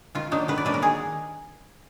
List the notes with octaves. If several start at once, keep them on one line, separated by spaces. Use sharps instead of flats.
D#3 F4
F#3 A#3 D4 D#4
D#3 B4
D5
F#3 A#3 D4 B4
A#4
D#3 G#4